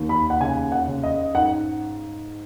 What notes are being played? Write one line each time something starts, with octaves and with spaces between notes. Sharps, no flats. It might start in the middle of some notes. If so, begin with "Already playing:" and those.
Already playing: D#2
B5
F#5
C#3 G#5
F#5
C#3
D#5
G#2 F#5